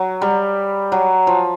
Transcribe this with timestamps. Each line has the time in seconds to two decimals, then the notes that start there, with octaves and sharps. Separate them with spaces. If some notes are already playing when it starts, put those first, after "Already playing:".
Already playing: F#3
0.22 G3
0.92 F#3
1.27 F3